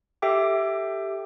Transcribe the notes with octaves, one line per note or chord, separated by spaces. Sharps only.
G4 A4 E5 G5 D6